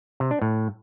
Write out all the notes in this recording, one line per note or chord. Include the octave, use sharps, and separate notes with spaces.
C3
D4
A2